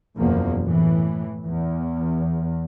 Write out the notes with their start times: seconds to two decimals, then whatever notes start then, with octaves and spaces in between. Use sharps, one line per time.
0.17 F#1 E2 B2 F3 A#3
0.64 A2 E3
1.46 E2